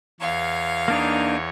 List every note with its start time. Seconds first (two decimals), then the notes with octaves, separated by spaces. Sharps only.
0.21 E2 C#5 F5
0.88 A#3 D4 D#4